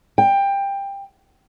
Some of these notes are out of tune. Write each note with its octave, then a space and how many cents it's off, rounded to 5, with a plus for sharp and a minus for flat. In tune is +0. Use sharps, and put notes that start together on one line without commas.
G5 +20